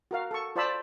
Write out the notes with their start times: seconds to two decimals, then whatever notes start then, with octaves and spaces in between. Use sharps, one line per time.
0.11 F#4 A#4 F5
0.31 A4 C#6
0.56 F4 C5 D5 A5 B5 E6